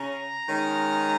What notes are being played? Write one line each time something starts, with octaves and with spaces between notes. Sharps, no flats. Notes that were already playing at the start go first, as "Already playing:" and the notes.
Already playing: C#3 C#4 A#5
D#3 G#3 C#4